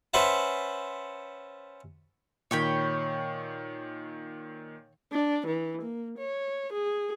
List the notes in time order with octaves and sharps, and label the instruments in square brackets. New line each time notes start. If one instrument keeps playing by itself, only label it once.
[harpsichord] C#4 B4 C5 E5 F#5 A5
[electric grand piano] A#2 D#3 [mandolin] C#5 G5 B5
[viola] D4
E3
A#3
C#5
G#4